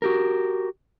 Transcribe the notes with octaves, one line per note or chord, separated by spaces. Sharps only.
F#4 G4 A#4